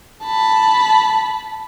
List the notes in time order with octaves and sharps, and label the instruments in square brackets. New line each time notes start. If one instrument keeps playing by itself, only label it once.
[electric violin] A5 B5